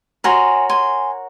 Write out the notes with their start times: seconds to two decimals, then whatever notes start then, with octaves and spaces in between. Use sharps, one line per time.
0.24 F#4 A#4 C#5 G#5 C6
0.70 G#5 C6